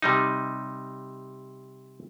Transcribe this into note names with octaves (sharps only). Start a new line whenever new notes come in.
C3 G3 D#4